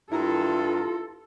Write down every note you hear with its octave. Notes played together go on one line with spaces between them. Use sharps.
G2 E4 F4 A4 A#4 A#5